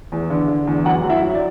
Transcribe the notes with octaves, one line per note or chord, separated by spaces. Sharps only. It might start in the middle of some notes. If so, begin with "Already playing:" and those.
E2
D3
D3
E2
F#2 F#4 F#5
F#2
E4 E5
F#3
D5